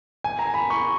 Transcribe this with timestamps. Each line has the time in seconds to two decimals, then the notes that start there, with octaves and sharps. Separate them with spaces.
0.24 G#5
0.39 A#5
0.54 B5
0.70 C#6